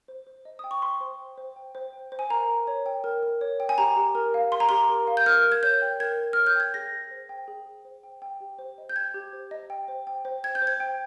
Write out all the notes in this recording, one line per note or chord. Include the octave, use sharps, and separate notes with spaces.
C5
C5
D#5
G5 D#6
C#6
G5 C6
C5
G5
C5
G5
C5
G5
C5
G#5
A#4 A#5
A#4
C#5
G5
A#4
A#4
C#5
G5
G#5
G4 A#5
G4
A#4
F5
G4 C6
A#5
G4 C6
A#4
F5
G6
A#4 F6
A#4
G#6
C#5 G6
G5
A#4 G#6
A#4
C#5 F6
G6
G5 G#6
G#4 A#6
G#4
C5
G5
G#4
G#4
C5
G5
G5
G4
C5
D#5
G6
G5 G#6
G4
C5
D#5
G5
C5
G5
C5
G5 G#6
G6
C5
G#6
G5